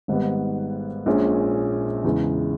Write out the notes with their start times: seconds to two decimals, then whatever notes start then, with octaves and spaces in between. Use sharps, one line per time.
0.08 G#1 G#2 G3 B3
1.06 A#1 A#2 G#3 C#4
2.04 E2 C#3 G#3